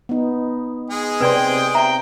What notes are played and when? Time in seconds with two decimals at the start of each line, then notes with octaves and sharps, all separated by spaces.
0.09 B3 D#4
0.90 G#3 G#4
1.21 C3 C4 B4 D5 G5 C6
1.75 E5 G5 A#5